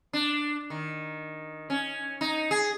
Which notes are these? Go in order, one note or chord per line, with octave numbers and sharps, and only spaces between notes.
D4
D#3
C#4
D#4
G#4